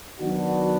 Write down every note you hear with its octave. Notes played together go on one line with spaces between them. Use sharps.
D#3 F#3 B3 D4 F#4